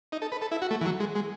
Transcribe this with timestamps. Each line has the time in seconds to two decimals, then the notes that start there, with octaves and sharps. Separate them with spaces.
0.12 D#4
0.22 A4
0.32 B4
0.42 A4
0.52 E4
0.62 F#4
0.71 A3
0.81 E3
0.86 F#3
1.00 G#3
1.15 G#3